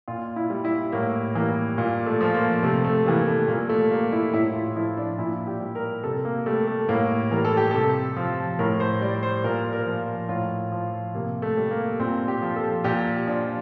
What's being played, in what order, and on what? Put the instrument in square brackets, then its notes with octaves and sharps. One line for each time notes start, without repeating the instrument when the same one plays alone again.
[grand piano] A#2 F4
E4
G3
E4
A2 A#3
E3 G3 A#3
A#2 A#3
A3
F3
A#3
C3 A3
A3
E3 G3 A#3
A3
A#2 A#3
A3
G3 A#3
E4
A2 E4
F4
F3 E4
D4
A#2 E4
G4
G3
A#4
C3 A4
A#3
G3 A3
A3
A2 A#3
E3 G3 A#4
A4
G4
C3 A4
F3
A2 A#4
C5
G3 D5
C5
A#2 A#4
A#4
F3
A2 F4
F3
C3 A#3
A3
G3
A#3
A#2 C4
G4
F3
A4
A#2 G4
F3 D4